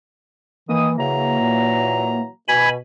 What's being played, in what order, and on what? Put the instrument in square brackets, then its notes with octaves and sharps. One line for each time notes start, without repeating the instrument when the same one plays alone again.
[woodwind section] D#3 D#6 [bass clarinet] E3 [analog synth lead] A#3
[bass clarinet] C#3 [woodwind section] E3 F#3 A#5
[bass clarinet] A#2
[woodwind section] B2 [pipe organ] G#5 B5